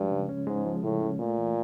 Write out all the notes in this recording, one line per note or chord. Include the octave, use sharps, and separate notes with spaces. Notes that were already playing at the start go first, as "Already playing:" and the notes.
Already playing: G2 F3 G#3
C#3
C#4
G#2 G#3
F3
A2 C#3
C#4
A#2 A3
E3